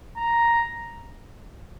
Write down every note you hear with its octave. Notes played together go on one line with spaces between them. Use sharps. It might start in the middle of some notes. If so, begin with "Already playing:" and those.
A#5